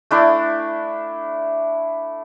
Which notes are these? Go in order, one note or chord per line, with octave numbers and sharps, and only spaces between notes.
A3 D4 E4 D5